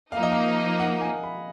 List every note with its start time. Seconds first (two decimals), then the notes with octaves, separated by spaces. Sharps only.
0.12 F3 A#3 D#4 F5
0.23 D#5
0.32 F5
0.80 F#5
1.01 G#5
1.23 B5